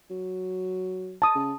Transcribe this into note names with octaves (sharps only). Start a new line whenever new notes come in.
F#3
A5 D#6
C#3